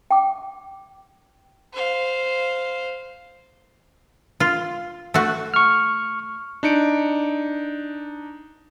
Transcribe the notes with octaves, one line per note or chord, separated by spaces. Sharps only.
G5 D6
C5 F5
F4
A3 F#4
C#6 F6
D4 D#4 C#7 D7